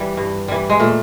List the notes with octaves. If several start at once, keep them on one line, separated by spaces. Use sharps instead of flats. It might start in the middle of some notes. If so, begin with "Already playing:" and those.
Already playing: E3 G3
G2
E3 G3
G#3
A#2 A3